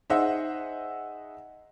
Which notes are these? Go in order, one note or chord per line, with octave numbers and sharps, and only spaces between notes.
D#4 G#4 C5 D#5 E5 F#5